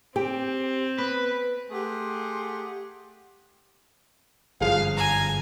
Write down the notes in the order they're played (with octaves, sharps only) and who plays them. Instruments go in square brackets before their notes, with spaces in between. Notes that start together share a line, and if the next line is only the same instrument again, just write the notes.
[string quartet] C4 [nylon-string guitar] G4 G5
[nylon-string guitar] B3 [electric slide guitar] B4
[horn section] A3 G4 G#4 F#5 C6
[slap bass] G1 F#2 [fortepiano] F3 G#3 G#4 [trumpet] F5
[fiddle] G#5 [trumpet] A#5